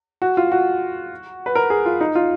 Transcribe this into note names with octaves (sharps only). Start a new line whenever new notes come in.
F#4
F4
F#4
B4
A#4
G#4
F4
D#4
F4